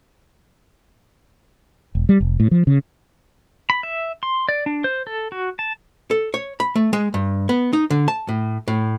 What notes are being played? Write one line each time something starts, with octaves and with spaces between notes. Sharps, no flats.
E1
G3
F1
A2
F3
C#3
B5
E5
C6
D5
D4
C5
A4
F#4
A5
A4
C#5
B5
A3
G#3
G2
B3
D#4
D3
A5
A2
A2